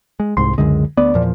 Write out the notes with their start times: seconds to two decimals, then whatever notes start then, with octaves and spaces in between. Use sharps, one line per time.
0.20 G#3
0.37 C2 G#2 C6
0.58 C#2 F#2 D3 G#3
0.97 D2 B3 D5
1.14 E2 A#2 F3